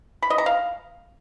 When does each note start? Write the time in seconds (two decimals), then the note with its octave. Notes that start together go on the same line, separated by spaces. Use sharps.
0.23 B5
0.30 D#5
0.38 A#5
0.46 F5